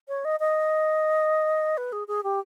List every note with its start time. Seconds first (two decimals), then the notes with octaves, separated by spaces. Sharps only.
0.08 C#5
0.25 D#5
0.40 D#5
1.77 B4
1.92 G#4
2.08 G#4
2.23 G4